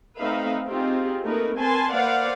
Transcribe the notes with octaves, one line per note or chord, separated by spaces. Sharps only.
A3 C4 D#4 B4 E5 F5
C4 D#4 F4 G4 G#4
A3 A#3 D#4 A#4 B4
C4 A#4 B4 G#5 A5 C6
A#3 B4 C5 D5 F5 F#5